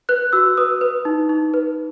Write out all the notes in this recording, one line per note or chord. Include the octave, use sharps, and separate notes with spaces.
B4 F#6
F#4 E6
B4 D#6
B4
D#4
D#4
B4